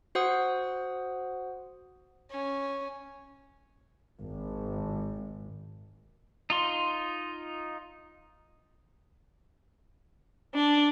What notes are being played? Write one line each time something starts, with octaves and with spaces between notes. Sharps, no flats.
F#4 C5 F#5 D#6
C#4
G#1
D#4 F4 C6
D4